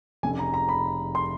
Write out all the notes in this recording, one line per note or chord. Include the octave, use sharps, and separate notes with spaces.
F1 F2 C#3 G#5
A#5
A#5
B5
C6